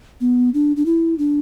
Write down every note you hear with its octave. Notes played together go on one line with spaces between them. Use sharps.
B3
D4
D4
E4
D4